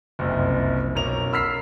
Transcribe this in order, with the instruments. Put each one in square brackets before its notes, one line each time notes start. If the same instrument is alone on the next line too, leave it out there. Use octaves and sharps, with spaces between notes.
[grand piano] F#1 C2 F2
B1 C#4 A#4 F7
B5 E6 F6 B6 C7